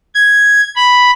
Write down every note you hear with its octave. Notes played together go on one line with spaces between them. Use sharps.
G#6
B5